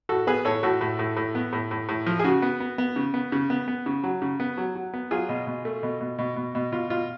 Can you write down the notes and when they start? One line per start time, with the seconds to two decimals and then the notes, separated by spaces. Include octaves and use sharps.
0.09 A2 F#4 A4
0.27 B3 G#4 B4
0.45 A2 A4 C#5
0.63 A2 F#4 A4
0.81 A2
0.99 A2
1.17 A2
1.35 B3
1.53 A2
1.71 A2
1.89 A2
2.06 F3
2.19 G#4
2.24 C#3 F#4
2.42 B3
2.60 B3
2.78 B3
2.96 C#3
3.14 B3
3.32 C#3
3.50 B3
3.68 B3
3.86 C#3
4.03 F#3
4.22 C#3
4.40 B3
4.57 F#3
4.75 F#3
4.93 B3
5.11 F#3 F4 G#4
5.29 B2
5.47 B2
5.65 A3
5.83 B2
6.01 B2
6.18 B2
6.36 B2
6.55 B2
6.72 B2 F4
6.90 B2 F4